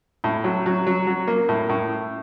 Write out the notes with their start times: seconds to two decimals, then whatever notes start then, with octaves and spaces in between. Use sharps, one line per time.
0.24 A2
0.44 F#3
0.66 F#3
0.87 F#3
1.07 F#3
1.27 A#3
1.49 A2
1.69 A2